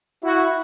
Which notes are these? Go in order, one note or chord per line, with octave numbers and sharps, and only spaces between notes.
E4 F#4